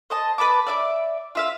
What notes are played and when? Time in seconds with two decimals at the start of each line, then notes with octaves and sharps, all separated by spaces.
0.10 C5 D#5 A5
0.38 B4 A5 B5 D6
0.67 D5 E5 D6
1.35 F4 E5 F5